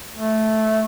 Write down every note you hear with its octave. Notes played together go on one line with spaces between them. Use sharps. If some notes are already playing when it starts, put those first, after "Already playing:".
A3